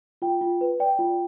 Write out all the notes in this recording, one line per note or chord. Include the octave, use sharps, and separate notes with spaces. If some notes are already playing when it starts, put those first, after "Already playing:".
F4 G5
F4
B4
D5 G5
F4